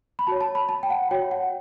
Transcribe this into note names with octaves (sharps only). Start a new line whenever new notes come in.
B5
F#4 C#5 A5
A5
B5
A5
G5
F#5
F#4 C#5 G5
F#5